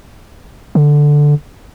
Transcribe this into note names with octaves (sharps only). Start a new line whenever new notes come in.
D3